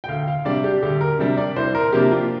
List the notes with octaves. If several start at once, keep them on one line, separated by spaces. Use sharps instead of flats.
G5
D2 F5
F5
C3 G3 D4 D5
G4
D2 G4
A#4
C3 G3 D4
D5
C2 C5
A#4
C3 F3 A#3 D4 G4
F4